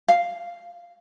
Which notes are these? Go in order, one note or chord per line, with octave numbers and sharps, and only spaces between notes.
F5